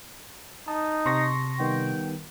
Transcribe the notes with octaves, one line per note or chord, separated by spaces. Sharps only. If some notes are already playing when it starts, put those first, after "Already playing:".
D#4 A5 D#6
C3 C6 C#6 A#6
D#3 G3 B3 G5